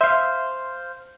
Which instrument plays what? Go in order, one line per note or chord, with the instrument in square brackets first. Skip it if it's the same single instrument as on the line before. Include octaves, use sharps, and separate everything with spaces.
[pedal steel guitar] C5 F5 [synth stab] E5